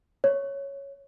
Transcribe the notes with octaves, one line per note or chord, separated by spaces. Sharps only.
C#5